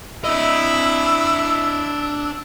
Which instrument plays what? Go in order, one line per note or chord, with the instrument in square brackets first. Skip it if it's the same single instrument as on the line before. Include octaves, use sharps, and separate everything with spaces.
[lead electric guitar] D4 D#5 [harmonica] E4 [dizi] E6